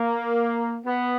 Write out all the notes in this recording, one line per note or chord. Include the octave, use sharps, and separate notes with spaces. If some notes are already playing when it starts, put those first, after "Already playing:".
Already playing: A#3
B3